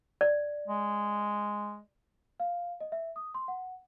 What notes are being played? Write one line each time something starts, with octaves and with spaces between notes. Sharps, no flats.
D5
G#3
F5
D#5
E5
D#6
C6
F#5